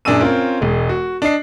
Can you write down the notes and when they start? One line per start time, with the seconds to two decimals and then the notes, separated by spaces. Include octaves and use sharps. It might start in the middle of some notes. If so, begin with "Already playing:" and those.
0.05 F#2 A#2 D4 G#4 E6 D#7
0.21 C4 C#4 F4 A#4
0.61 E1 G#3
0.89 F#4
1.22 D4 D#5 C7